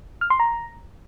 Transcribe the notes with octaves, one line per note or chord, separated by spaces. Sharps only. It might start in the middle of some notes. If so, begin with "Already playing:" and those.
F6
C6
A#5